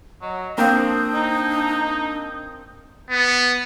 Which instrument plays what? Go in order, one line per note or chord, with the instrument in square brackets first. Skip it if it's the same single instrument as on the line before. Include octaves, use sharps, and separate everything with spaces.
[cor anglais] F#3 [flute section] D#5
[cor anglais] F3 [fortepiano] A#3 C4 C5 [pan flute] D4 [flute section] D#6 G6
[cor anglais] D#4
[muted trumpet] B3